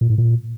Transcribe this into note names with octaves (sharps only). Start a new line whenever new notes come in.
A#2
A2
A#2